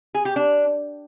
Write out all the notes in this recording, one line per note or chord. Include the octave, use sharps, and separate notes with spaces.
G#4
G4
D4